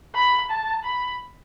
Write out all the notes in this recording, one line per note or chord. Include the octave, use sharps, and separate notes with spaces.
B5
A5
B5